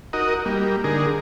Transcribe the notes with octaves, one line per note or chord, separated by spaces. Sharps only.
D#4 F#4 A#4 D#5
G3 A#3
D3 D#4 G#4 A#4